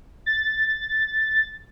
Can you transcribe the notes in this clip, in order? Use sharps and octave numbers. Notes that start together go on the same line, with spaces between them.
A6